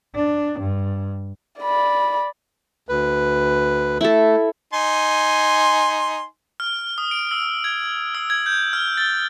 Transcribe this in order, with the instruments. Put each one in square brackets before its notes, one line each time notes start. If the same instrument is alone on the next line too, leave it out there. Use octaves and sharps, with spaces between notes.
[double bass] D4
G2
[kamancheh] D5 B5
[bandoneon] D2 B4
[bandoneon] A3 [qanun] E4 A4
[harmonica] D#4 G#5 C6
[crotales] F6
D#6
D7
E6
G#6
E6
G#6
G6
F6
A6